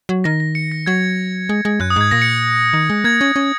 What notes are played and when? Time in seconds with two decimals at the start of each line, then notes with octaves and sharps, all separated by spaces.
0.09 F#3
0.24 D#3 A#6
0.40 A#6
0.55 C#7
0.72 A#6
0.86 F#3 G#6
1.49 G#3
1.65 G#3
1.80 F#2 F#6
1.90 D#6
1.96 G#2 G#6
2.11 A#2 A#6
2.22 C#7
2.73 D#3
2.90 G#3
3.04 A#3 G#6
3.21 C#4
3.36 C#4